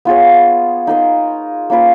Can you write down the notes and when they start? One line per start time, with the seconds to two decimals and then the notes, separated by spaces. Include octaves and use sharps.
0.05 B3 F4 G#4 C#5
0.87 D#4 A#4 D#5
1.70 A#3 C#4 F4 B4